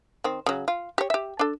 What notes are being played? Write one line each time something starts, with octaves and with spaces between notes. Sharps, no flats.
D#3 C4
C#3 F#3
F4
G4 C#5
G4 E5
D4 A4